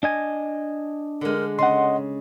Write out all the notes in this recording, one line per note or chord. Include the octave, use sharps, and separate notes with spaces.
D4 D#5 G#5
D3 G#3 A#4
C#3 D#5 F#5 C6